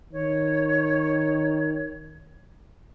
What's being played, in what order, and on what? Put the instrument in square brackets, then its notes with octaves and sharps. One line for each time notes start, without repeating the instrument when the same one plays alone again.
[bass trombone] D#3 [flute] C#5